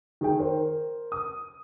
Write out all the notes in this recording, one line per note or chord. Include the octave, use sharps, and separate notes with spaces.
D#3 G#4 G5
A#4 C5
D#6